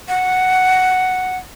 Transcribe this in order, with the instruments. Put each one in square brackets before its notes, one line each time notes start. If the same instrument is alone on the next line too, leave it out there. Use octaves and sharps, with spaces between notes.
[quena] F#5